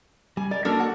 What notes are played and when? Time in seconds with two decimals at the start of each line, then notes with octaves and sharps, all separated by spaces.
0.37 G3 G#5
0.51 A#4 D5
0.65 F#3 A#3 D4 F#4 A4 A#4
0.80 F#5